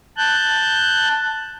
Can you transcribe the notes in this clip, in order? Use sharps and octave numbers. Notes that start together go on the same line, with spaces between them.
A5 F#6 G6